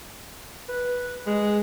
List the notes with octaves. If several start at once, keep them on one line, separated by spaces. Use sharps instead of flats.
B4
G#3